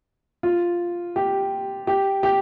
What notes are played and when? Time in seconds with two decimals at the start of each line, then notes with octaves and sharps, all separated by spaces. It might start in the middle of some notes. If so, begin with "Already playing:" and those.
0.43 F4
1.16 G4
1.87 G4
2.23 G4